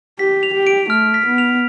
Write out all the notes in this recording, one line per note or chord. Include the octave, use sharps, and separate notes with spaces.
G4 B6
F7
G4
D7
A3 F6
B6
B3
F7